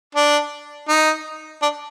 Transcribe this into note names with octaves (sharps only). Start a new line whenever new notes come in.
D4
D#4
D4